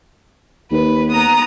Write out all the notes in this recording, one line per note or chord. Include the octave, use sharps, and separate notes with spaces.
D#2 B4
B3 A#5 D#6